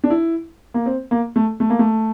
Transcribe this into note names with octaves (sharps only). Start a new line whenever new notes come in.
D4
E4
A#3
C4
A#3
A3
A3
A#3
A3